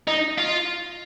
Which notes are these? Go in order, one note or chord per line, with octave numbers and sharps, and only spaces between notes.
D#4
F4